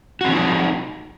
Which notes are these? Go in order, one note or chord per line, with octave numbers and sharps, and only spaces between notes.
F3 C4 D#4 F#4